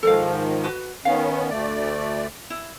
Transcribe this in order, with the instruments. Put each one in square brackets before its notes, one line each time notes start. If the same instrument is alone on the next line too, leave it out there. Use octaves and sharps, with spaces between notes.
[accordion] G#2 D#3 F3 [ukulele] A4 A#4 F5
[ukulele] F#4 B4
[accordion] D#3 B3 C#4 [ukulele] F5
[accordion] D2 A3 D5
[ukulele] E4